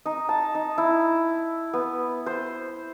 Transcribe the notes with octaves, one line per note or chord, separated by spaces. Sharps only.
D#4
A5
D#4
E4
B3
C5